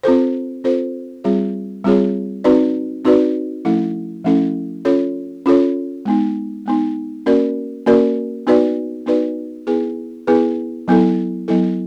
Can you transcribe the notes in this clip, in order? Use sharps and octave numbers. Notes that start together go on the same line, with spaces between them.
C4 F4 A4 C5
C4 F4 A4 C5
G3 C4 F4 G#4 C#5
G3 C4 F4 G#4 C#5
C4 D#4 F#4 B4 D5
C4 D#4 F#4 B4 D5
F3 A3 C#4 E4 A4
F3 A3 C#4 E4 A4
C#4 F4 A4 C#5
C#4 F4 A4 C#5
G#3 B3 D#4
G#3 B3 D#4
A#3 C#4 F#4 A#4 D5
A#3 C#4 F#4 A#4 D5
B3 D#4 F#4 B4 D5
B3 D#4 F#4 B4 D5
B3 E4 G#4 B4
B3 E4 G#4 B4
F#3 B3 E4 A4
F#3 B3 E4 A4